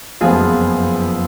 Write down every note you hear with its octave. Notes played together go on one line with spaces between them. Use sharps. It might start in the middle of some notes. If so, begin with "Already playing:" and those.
F#1 F2 F3 B3 F4 G#4